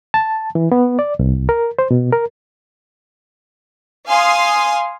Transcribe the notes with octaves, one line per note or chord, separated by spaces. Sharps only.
A5
E3
B3
D5
C2
A#4
C5
B2
A#4
F5 G#5 C6 D#6